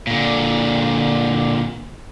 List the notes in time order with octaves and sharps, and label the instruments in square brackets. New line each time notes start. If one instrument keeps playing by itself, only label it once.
[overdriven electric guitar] A#2 D3